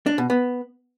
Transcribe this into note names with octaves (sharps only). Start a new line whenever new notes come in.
D4
B2
B3